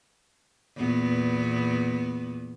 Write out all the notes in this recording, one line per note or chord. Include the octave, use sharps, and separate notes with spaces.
E2 A#2 B3